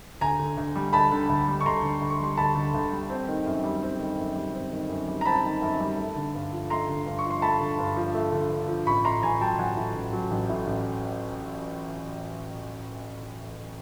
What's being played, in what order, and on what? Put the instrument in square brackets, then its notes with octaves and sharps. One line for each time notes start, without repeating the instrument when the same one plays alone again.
[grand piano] D2 G#5 A#5
D3
D2
G3
D2 A5 B5
D3
D2
G3
C#6
D2 A#5 C6
D3
D2
C#6
G3 C6
D2 A5 B5
D3
D2
G3
C4
D#3
F#2
G3
C4
D#3
F#2
G3
C4
D#3
F#2
G3
A#5
C4 A5 B5
D#3
F#2
G3
A3
D3
G2
F3
A3 A#5 C6
D3
G2
C#6
F3
C6
A3 A5 B5
D3
G2
F3
A3
D3
G2
F3
A1 B5 C#6
A2 A#5 C6
A1 G#5 A#5
F#3 G5 A5
A1 F#5 G#5
A2
A1
F#3
A1
A2
A1